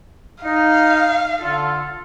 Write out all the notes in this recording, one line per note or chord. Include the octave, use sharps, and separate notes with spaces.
D#4 F5
D3 F4 A4